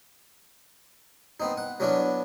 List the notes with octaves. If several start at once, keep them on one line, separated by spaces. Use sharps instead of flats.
B3 C4 D#4
F#5
F#3 B3 C#4 D4 E4